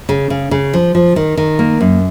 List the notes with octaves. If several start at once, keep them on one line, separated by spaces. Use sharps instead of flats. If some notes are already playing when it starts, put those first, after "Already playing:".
C#3
C#3
C#3
F3
F3
D#3
D#3
A#3
F#2